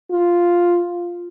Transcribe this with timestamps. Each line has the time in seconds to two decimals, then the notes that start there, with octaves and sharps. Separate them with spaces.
0.12 F4